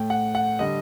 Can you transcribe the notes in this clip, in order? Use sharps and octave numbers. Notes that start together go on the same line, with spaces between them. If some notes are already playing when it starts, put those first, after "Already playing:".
Already playing: A2 A3 G5
F#5
F#5
D3 G3 D#5